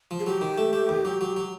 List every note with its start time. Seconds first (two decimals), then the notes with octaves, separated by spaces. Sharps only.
0.11 F3
0.19 G#4
0.26 F#3 G4
0.41 D#3
0.58 A3
0.73 A3
0.89 D#2
1.05 F#3
1.21 F#3
1.36 F#3